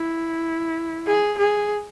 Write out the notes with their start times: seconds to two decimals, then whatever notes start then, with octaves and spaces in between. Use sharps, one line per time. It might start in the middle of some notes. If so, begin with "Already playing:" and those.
Already playing: E4
1.07 G#4
1.38 G#4